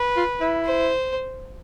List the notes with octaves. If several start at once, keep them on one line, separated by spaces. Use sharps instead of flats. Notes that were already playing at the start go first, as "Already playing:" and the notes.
Already playing: B4
F4
E4
C5